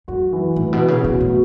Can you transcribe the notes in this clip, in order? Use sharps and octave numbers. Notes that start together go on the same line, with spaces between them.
F#2 F#4
E3
A2 E3
B2
B3
C#3
B2 F#4
A2
B2